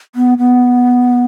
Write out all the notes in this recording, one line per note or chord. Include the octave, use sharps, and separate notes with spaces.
B3
B3